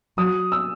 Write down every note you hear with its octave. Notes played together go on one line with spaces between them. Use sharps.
F#3 D#6
E6